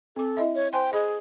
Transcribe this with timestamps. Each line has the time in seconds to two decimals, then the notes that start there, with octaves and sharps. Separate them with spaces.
0.16 C4 A4 D6
0.37 E4 D#5 E5
0.55 C#5
0.73 C5 G5 G#5 C6
0.93 G#4 D#5 B5